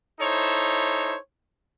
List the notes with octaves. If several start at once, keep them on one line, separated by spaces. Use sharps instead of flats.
D#4 E4 A4 C5 C#5